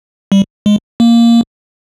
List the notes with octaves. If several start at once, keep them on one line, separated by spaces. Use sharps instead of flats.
G3
G#3
A#3